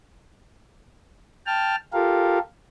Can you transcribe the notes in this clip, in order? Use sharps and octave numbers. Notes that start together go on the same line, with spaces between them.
G5 A5 F6
F4 G4 A4 A#4 F5